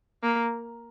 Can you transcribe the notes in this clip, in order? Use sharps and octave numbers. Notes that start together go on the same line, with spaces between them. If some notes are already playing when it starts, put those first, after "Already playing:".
A#3